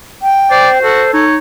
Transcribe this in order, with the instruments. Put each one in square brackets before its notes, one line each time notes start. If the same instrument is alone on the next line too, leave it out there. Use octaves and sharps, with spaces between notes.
[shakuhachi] G5
[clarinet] C5 [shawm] D5
[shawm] F#4 [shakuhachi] A4
[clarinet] D#4 [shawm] C#5